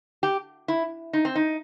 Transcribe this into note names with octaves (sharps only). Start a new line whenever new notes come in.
G4
E4
D#4
C4
D#4